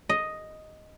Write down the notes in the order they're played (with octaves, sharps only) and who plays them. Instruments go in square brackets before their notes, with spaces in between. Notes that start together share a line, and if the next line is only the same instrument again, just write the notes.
[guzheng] D#5